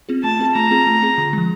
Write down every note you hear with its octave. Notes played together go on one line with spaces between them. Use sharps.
C4 F4 G#4
A3 A5
C4 F4 G#4
A3 A#5
C4 F4 G#4
A3
C4 F4 G#4
D3
F3 G#3